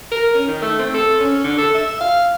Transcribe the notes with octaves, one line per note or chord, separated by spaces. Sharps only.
A#4
C#4
D#3
A3
C4
A4
C#4
D3
A4
E5
F5